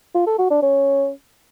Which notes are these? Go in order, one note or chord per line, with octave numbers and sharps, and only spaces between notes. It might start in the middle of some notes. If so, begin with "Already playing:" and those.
F4
A4
F#4
D4
C#4